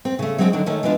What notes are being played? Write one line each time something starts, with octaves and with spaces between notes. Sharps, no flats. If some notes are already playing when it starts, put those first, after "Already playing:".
C4
C#3 A3
F#3 G#3 C4 D4 E4 G#4
D3 D#3 F#3 D4
D#3 G#3 A3 C#5
E3 G#3 B3 D4 F4